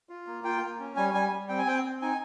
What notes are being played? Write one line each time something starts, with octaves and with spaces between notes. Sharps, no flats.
F4
A#3
F4 G5
A#3
C#4
G3 G#5
G3 G#5
G3
C4 G5
G#5
C4 G5
C4
D#4 G#5